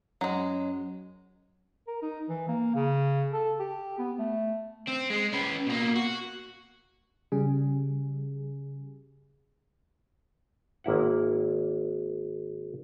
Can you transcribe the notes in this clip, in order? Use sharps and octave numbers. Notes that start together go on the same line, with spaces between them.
F#2 F#3 G#3
A#4
D#4
E3
A#3
C#3
A4
G4
B3
A3
C4
G#3
C#4 B4
B2 A#3
F#4
C#3 G3 G#4
G#1 A#3 E4 F#5